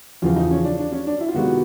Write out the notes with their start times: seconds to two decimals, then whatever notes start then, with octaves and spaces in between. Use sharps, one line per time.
0.22 E2 C#3 F3 F4
0.36 D#4
0.51 C#4
0.65 D4
0.79 D4
0.92 C#4
1.07 D4
1.21 E4
1.28 F4
1.35 C3 D#3 G#3 B3 F#4